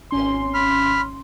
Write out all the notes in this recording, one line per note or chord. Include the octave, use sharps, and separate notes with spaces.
G#1 C#4 C6
B5 F6